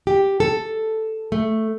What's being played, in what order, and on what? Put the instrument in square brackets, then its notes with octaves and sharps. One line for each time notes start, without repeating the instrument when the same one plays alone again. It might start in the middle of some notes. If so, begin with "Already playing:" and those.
[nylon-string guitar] G4
A4
A3